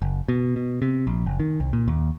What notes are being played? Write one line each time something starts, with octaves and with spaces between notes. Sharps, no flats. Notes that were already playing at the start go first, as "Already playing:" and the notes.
F#1
B2
B2
C3
A#1
F#1
D#3
C2
A#2
D#2